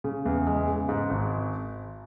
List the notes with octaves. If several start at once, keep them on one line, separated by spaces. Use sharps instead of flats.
C#3
E2
G#3
C#3
G#2
G#1